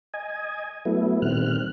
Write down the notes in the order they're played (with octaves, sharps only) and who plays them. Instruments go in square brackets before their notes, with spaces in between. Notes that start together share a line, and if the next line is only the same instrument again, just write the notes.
[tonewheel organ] D#5 G#5
F#3 A3 B3 E4
A#2 D#3 G3 C4 F6 F#6